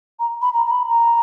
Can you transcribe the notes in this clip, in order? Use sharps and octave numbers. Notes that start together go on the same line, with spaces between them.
A#5
B5
A#5
A#5
B5
A#5